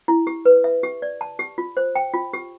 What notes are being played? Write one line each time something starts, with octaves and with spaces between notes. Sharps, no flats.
E4
G4
B4
E5
G4
D5
A5
G4
F4
C5
G5
F4
G4